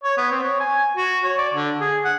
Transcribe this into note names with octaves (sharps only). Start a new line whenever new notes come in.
C#5
B3
C4
C#5
G#5
F#4
C#5
D5
D3
G#4
F#5